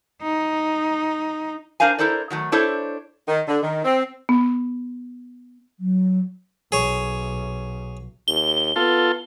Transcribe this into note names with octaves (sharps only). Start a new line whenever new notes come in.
D#4
D4 A#4 C5 F5 G#5
E4 A4 A#4 C5 D5
D#3 F#3 A3
D4 E4 A4 C5 C#5
D#3
D3
D#3
C4
B3
F#3
B1 G#4 C#5
D#2 G7
B3 F4 A4